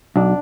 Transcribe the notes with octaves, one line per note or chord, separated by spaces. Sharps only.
B1 D4